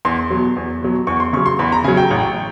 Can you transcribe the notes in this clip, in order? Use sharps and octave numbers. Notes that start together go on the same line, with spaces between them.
E2 C6
B2 F#3
E2
B2 F#3
E2 C#6
C6
C#3 F#3 C#6
C6
E2 B5
A#5
C#3 F#3 G#5
G5
A1